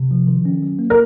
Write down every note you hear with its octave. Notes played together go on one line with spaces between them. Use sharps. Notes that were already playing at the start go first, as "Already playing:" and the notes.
Already playing: C3
F3
D#3
C#4
F#3
A#3
A#4